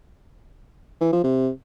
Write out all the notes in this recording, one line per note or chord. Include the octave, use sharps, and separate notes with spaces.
E3
F3
C3